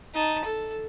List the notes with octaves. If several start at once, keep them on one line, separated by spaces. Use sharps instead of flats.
D#4 A5
A4